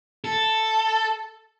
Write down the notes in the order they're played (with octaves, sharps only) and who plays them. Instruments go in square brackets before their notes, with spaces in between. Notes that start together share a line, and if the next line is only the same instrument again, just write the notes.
[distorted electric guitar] A4